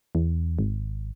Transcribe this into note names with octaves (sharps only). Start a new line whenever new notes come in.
E2
G#1